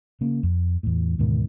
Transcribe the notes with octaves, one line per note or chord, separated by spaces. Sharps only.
C#3 A#3
F2
E2 A2
D2 G#2 B2 D#3